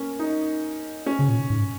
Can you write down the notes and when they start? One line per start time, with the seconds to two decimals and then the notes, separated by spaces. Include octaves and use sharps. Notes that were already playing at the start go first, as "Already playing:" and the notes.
Already playing: A#3 C#4
0.19 D#4
1.06 C#4
1.19 C#3
1.29 A#2
1.50 G#2